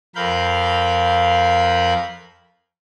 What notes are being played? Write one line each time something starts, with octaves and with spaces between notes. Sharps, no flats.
F2 A#4 F5 B5 G6